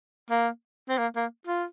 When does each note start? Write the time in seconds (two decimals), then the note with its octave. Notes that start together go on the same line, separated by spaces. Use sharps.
0.30 A#3
0.89 C4
0.98 A#3
1.16 A#3
1.47 F4